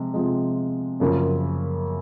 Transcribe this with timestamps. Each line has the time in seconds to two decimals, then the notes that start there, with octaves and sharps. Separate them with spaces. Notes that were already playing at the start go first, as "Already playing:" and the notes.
Already playing: C3 F3 G#3
0.14 C3 F3 G#3
1.00 F#2 C#3 F3 A#3